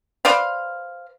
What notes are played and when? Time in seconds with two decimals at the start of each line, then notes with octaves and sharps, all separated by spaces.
0.25 B4 C5 D5 F5